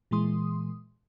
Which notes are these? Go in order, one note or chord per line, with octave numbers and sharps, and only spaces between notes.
A#2 E3 G#3 C6 D#6